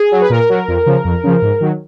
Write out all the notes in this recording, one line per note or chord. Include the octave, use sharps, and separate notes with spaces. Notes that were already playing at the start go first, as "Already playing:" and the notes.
Already playing: G#4
F#3
B4
A#2 A#4
F#3
F2
C#3 F3
F2
C#3 F3
G#2
D#3 F#3